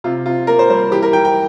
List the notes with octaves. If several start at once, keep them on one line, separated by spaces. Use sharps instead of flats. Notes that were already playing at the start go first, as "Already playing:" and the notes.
C3 F4
C3 F4
A#3 A#4
C5
G3 C5
E3 G4
A#4
E3 G5
G5